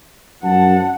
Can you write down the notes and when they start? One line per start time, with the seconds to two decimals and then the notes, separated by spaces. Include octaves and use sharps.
0.43 F#2 F3 F#5 A5